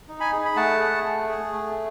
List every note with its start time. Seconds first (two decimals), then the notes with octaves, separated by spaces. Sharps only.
0.09 D#4
0.20 G#5 B5
0.33 G#4
0.45 B5
0.56 A3 F#5 A5
0.80 G#4
1.04 A3
1.28 G#4
1.52 A3